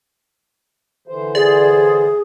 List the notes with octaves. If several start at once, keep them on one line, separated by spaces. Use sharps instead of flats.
D3 E3 C5
G#4 D5